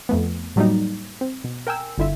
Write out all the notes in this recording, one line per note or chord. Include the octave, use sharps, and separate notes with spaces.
F2 A3 B3
A2 F#3 G3 A#3 D#4
C4
B2
A#4 G5 G#5 E6
G1 D3 E4 F4 E5